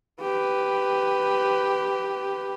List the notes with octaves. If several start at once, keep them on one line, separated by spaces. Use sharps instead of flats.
G4 B4